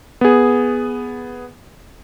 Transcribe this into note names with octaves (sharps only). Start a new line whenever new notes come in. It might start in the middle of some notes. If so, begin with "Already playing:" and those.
B3 G#4